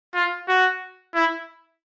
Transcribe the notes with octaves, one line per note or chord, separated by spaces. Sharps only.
F4
F#4
E4